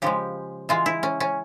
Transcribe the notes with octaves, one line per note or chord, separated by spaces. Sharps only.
C#3 F3 G#3 G4
E3 G#3 F4
E4
C#4
C#4